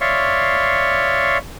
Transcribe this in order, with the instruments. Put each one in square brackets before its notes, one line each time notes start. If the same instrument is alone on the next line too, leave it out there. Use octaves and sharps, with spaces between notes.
[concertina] C#5 D5 E5 F5 C6 C#6